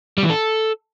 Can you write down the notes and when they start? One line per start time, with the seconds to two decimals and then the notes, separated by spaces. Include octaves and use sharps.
0.18 G3
0.24 E3
0.30 A4